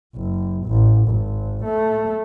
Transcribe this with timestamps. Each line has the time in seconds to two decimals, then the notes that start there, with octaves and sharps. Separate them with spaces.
0.16 F#1
0.67 A1
1.08 G#1
1.64 A3